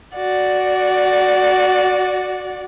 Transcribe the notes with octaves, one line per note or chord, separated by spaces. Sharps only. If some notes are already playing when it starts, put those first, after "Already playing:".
F#4 D5